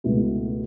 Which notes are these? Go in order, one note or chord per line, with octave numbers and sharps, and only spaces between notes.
C#2 B2 A3 E4